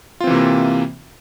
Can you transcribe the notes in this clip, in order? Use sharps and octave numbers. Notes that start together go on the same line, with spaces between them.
C3 E3 A#3 C4 F4